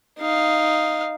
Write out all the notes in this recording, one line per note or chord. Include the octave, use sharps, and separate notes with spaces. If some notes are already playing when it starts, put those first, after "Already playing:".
D#4 F5